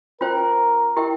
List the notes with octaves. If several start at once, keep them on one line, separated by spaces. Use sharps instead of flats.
C#4 F4 A#4 C5 G5
E4 G4 A#4 E5 G5